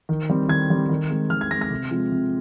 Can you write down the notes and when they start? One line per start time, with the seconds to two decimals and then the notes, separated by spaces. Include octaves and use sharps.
0.09 D#3
0.30 G3 C4
0.49 D#3 G#6
0.70 G3 C4
0.89 D#3
1.10 G#3 C4
1.30 D#3 F6
1.41 G#6
1.51 G#3 A#6
1.53 C4
1.61 A#6
1.71 C3
1.91 F3 G#3 C4
2.11 C3